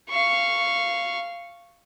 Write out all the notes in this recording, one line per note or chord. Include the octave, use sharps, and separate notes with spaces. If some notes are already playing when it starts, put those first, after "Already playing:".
F5 C#6